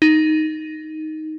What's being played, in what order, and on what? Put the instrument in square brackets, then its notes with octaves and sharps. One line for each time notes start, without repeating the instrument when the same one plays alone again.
[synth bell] D#4